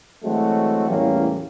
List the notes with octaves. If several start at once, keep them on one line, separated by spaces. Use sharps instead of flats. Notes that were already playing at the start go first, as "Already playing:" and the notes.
E3 F#3 G#3 A3 C4 F#4
E2 A2 F#3 G3 A#3 C#4